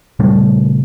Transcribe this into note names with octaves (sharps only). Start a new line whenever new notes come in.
A#2 C#3 G3 A3